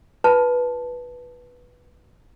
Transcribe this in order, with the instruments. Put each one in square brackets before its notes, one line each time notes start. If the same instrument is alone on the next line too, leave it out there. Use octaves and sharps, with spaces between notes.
[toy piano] F4 B4 A5